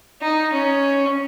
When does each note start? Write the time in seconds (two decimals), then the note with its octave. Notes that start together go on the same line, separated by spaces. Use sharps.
0.22 D#4
0.52 C#4